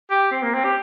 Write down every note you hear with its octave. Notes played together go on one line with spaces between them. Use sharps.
G4
C4
A#3
C4
G4